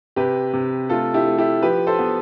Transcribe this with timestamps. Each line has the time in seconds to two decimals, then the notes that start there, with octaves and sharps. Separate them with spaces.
0.16 C3 G4 B4
0.53 C3
0.90 A3 F4 A4
1.14 E4 G4
1.27 A3
1.38 E4 G4
1.63 F3 G4 B4
1.87 A4 C5
1.99 B3